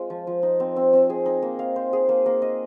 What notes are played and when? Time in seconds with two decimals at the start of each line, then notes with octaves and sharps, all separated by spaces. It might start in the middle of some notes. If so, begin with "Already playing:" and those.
Already playing: G#3 C4 F4
0.10 F3
0.27 F3
0.43 D#4
0.60 C4
0.76 C4
0.93 C4
1.10 G#4
1.26 D#4
1.42 A#3
1.59 F5
1.76 C5
1.93 G#4
2.09 A#3
2.26 A#3
2.42 D#5